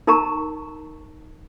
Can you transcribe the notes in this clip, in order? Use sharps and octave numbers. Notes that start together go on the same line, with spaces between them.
D#4 A#4 A5 A#5 C#6